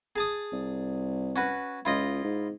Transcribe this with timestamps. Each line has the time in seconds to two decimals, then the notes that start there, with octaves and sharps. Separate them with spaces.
0.16 G#4 A5 D#6
0.52 C2
1.36 C#4 F#4 B4
1.85 C#2 E4 F4 D#5
2.24 G#2